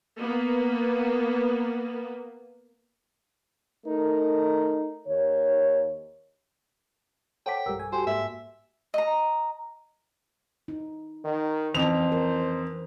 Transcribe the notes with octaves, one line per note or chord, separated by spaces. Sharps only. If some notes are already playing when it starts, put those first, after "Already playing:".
A#3 B3
A3 D#4 A4 A#4
D#2 D#3 C#5
A4 C5 C#5 F#5 G5 D6 B6
B1 G2 G3 G4 A#4 E6
G3 G#5
F#4 G4 A4 C5 G#5
G#2 A#3 E5
D#5 A#5
D#4
D#3
F2 D#3 E3 C#4 C5 F7
A#4